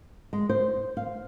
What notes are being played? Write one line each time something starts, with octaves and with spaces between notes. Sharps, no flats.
G#3
C5
F5